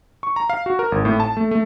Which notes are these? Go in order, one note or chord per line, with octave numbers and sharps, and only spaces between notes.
C#6
A#5
F5
F#4
A#4
G#1
A2
A5
A3
A3